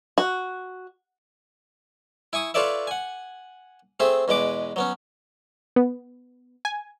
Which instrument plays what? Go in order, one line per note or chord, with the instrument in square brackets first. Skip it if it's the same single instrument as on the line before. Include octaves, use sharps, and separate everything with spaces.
[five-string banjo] F#4
[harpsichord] E4 G#5 C#6 D#6
F4 A4 B4 C#5 D5 E5
F#5 G#5
A3 C4 G#4 E5
E2 B2 G#3 B4 D6
F#3 B3 C#4
[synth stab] B3
G#5